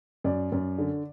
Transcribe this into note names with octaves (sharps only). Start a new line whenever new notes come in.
F#2 D5
F#2
D3